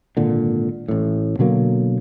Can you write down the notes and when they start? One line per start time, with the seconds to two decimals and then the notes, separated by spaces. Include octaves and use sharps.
0.17 G#1 A#2 D3
0.88 A1 A2
1.39 B2 D3 F#3 A#3